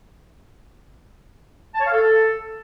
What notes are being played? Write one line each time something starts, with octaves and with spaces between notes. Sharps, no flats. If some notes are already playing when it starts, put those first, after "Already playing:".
A5
C#5
F5
A4